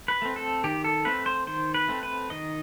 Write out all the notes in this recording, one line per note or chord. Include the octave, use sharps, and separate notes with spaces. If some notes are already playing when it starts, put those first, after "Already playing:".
B4
A3 C4
A4
D#3 G4
A4
A3 C4 B4
C5
D#3 C5
B4
A3 C4
B4
D#3 D#5